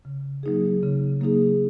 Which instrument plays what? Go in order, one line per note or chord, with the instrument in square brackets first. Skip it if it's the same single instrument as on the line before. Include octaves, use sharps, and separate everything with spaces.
[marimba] C#3
F#3 A#3 D#4 G#4
C#3
F#3 A#3 D#4 G#4